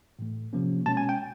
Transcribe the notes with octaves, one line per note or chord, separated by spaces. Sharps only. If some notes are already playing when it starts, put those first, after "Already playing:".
A2 E3 A3
C3 F3 A#3 C#4
B2 G#3 C#4 A5
G#5
G5